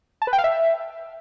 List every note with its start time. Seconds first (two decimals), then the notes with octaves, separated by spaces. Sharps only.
0.22 A5
0.27 B4
0.33 G5
0.38 F5
0.44 E5